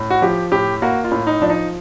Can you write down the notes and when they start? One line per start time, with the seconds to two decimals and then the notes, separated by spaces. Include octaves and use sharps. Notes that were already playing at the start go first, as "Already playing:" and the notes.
Already playing: A2
0.10 F#4
0.22 F3 G4
0.52 A2 G4
0.82 A#3 F#4
1.04 F4
1.11 A2
1.27 D#4
1.42 F3 D4
1.50 D#4